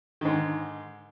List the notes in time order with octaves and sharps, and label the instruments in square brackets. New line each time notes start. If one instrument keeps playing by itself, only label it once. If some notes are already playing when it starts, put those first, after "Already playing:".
[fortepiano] G#2 D3 D#3